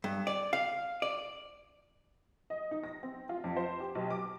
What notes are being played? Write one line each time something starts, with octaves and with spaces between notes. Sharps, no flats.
G2
D5
F5
D5
D#5
D#4
A#6
C4
F4
F2
C5
G4
B1
D6